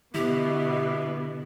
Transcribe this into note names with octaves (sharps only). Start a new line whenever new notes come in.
B2 D3 B3 E4 G4